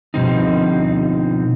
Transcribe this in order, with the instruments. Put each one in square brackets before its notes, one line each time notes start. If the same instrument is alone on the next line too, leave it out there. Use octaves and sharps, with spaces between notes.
[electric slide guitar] B2 D3 F3 G3 C4 D#4